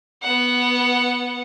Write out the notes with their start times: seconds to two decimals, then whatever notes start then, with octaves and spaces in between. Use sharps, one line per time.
0.23 B3 F#5